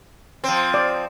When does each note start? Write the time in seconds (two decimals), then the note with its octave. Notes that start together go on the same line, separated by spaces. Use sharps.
0.44 F3 C4
0.74 D5